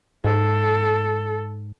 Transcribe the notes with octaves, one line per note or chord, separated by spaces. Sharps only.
G#2 A4